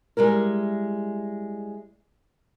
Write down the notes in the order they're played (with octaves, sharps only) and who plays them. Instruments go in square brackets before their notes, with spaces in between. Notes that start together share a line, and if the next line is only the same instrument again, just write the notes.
[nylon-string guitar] G3 G#3 E4 A#4